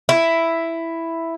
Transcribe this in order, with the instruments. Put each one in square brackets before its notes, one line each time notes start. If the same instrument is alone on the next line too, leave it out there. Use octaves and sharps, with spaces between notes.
[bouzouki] E4